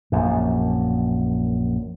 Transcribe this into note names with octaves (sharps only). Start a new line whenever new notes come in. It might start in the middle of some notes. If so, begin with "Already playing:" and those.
A#1 F#2